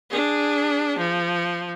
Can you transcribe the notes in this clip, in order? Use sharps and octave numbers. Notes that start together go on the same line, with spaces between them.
D4 G#4
F3